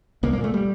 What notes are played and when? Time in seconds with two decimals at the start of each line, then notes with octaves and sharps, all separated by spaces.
0.23 C2 A#3
0.33 A#3
0.38 A#2
0.44 A3
0.54 G3